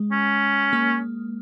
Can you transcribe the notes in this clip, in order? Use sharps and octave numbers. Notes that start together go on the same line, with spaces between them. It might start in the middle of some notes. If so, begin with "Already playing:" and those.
Already playing: G#3
C#4
A#3